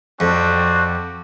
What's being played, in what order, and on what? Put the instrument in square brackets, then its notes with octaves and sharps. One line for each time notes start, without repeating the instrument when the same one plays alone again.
[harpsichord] F2 [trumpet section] C4 D4 F#4